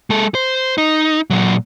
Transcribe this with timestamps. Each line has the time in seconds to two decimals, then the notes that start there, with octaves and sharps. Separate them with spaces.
0.10 G#3 A4
0.35 C5
0.78 D#4
1.30 A#2 F#3